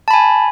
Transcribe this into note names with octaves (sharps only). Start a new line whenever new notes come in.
G#5 A5 B5